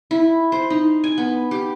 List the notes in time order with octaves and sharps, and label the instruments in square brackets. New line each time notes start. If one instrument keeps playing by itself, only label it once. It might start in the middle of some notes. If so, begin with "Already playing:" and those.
[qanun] E4
C5
D#4
G#5
B3
G4